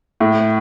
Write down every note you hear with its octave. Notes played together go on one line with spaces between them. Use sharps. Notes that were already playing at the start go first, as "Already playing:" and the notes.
A2